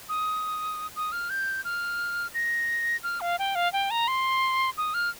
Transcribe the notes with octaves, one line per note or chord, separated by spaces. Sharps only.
D#6
D#6
F6
G6
F6
A#6
F6
F5
G5
F5
G5
A#5
C6
D#6
F6